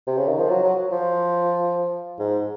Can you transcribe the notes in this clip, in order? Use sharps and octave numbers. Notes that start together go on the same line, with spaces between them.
C3
C#3
D#3
F3
F#3
F#3
F3
G#2